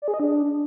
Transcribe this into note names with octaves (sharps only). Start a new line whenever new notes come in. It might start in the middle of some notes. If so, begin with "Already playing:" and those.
D5
G#4
D#5
D4